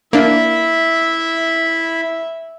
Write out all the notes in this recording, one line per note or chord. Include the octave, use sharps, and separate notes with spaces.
A#3 D4 E4 E5 B5